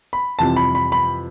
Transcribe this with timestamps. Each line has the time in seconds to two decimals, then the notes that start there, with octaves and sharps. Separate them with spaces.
0.13 B5
0.39 F2 C3 E3 G3 A5
0.56 B5
0.75 B5
0.92 B5